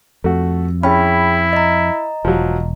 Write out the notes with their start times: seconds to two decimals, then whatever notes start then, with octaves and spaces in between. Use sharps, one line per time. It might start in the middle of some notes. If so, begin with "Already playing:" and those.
0.24 F2 A3 F#4
0.83 C#4 E4 G#4 G5 B5
1.53 D#5 A#5
2.25 E1 F3 F#3